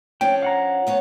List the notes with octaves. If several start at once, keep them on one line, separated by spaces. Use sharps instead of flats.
F3 C#4 D4 G5
F5 F#5 A#5
D2 B3 C#5